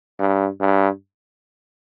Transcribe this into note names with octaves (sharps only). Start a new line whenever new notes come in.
G2
G2